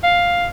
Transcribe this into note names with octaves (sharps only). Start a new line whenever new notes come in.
F5